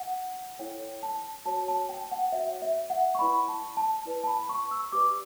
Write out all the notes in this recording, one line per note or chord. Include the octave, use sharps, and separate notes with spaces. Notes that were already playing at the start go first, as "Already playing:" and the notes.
Already playing: F#5
E4 A4 C#5 G5
A5
F#4 C#5 A5
A5
G5
G5
F#5
F#4 C#5 E5
E5
F#5
C#6
E4 B4 D5 B5
A5
A5
E4 B4 D5
A5
B5
C#6
E6
G4 B4 D5 D6